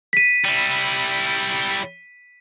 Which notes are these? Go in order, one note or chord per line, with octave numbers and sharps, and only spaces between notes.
B6 D#7
G3 E4